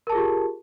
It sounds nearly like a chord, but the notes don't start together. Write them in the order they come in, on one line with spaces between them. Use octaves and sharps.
A#4 A5 G#4 F4 G4